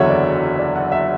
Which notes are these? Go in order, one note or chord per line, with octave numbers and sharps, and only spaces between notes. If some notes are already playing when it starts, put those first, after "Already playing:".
Already playing: F#1 E2 D3 F#3 C#5 E5 F#5
D5
D5
F#5
E5